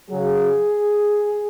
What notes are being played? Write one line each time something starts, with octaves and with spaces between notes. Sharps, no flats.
C#3 F#3 G#4